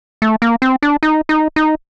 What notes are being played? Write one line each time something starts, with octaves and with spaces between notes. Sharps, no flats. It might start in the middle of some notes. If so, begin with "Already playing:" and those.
A3
A#3
C4
D4
D#4
D#4
D#4